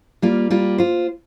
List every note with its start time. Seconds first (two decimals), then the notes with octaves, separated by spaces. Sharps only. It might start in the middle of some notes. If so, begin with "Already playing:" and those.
0.22 G3 A#3 F4
0.51 G3 A#3 F4
0.78 F4 C5